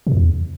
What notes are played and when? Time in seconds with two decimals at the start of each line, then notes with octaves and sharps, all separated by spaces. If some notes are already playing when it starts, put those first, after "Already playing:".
0.07 B2
0.12 F2
0.17 E2